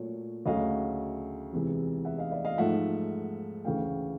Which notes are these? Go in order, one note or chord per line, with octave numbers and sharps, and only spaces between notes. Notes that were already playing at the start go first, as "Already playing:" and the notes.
Already playing: A#2 F#3 A3 C#5
D2 C#3 F#3 A3 D#5 F5
E2 C3 E3 G#3
E5 F#5
D#5 F5
D5 E5
D#5 F5
G#2 F3 A3 E5 F#5
D2 C#3 E3 A3 F5 G5